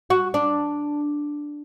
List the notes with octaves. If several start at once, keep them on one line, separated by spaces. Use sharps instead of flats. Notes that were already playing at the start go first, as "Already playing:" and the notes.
F#4
D4